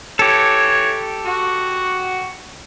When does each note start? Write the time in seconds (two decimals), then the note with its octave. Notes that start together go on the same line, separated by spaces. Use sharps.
0.19 E3 G4 A4 C#5
1.25 F#4